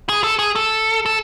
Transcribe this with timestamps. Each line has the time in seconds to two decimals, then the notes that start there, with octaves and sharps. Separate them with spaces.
0.09 G#4
0.24 A4
0.39 G#4
0.55 A4
1.06 A4